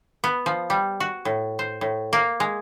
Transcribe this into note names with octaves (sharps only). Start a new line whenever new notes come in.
B3
F3
G3
F#4
A2
C5
A2
A#3
G#3